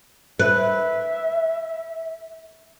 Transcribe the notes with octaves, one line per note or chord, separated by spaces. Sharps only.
B4 E5